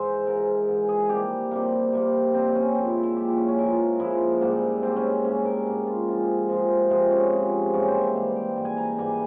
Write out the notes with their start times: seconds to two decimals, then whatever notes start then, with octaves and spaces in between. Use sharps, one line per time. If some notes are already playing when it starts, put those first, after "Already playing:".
Already playing: G#2 E3 G#3 C5 E5
0.26 G#2 E3 G#3 A#4
0.68 G#2 E3 G#3
0.89 G#4
1.09 C3 G3 A#3 G4
1.51 C3 G3 A#3
1.93 C3 G3 A#3
2.34 C3 G3 A#3 C4
2.55 C#4
2.75 A#2 F3 G#3 C4
2.89 E4
3.03 E4
3.16 A#2 F3 G#3 G4
3.28 E4
3.37 C#4
3.48 C#4
3.58 A#2 F3 G#3 A#4
3.99 A#2 F3 G#3 E4
4.41 G#2 G3 A#3
4.83 G#2 G3 A#3 C4
4.96 C#4
5.24 G#2 G3 A#3 C#4
5.45 A#4
5.66 G#2 G3 A#3
5.87 F4
6.08 C3 F3 G#3
6.48 C3 F3 G#3
6.90 C3 F3 G#3
7.11 C#4
7.32 C3 F3 G#3
7.73 G#2 E3 G3 A#3 C#4
7.88 C5
8.01 E5
8.14 G#2 E3 G3 A#3 F5
8.36 G5
8.56 G#2 E3 G3 A#3
8.65 G#5
8.77 A#5
8.98 G#2 E3 G3 A#3 G#5